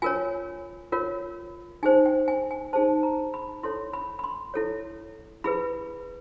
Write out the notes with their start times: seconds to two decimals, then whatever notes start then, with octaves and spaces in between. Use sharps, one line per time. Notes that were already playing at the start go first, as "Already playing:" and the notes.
0.02 F4 A#4 C#5 G#5
0.92 F4 A#4 C#5
1.83 D#4 G#4 C5 G#5
2.06 G5
2.28 G#5
2.51 G#5
2.73 D#4 G#4 C5 A5
3.03 A#5
3.34 B5
3.63 E4 A4 C#5 C6
3.93 B5
4.19 B5
4.24 C6
4.54 E4 A4 C#5
5.44 E4 G#4 B4 B5